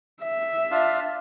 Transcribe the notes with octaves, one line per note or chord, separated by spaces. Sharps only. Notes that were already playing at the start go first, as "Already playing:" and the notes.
E5
D4 F4 F5